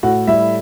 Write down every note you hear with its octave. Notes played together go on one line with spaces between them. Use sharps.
A2 F#4 F#5
G3 E4 E5